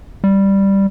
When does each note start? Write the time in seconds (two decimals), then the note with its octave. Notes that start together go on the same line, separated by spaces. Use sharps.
0.24 G3